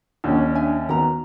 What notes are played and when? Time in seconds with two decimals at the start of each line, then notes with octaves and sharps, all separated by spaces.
0.24 D#2 C#4 D4
0.55 E5 G#5
0.89 D#3 B3 F#4 A#5